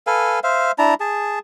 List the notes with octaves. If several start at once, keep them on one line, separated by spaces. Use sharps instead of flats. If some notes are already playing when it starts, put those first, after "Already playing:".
A4 B4 F5 G#5
C5 E5 F5
D4 E4 A5 A#5
G#4 A5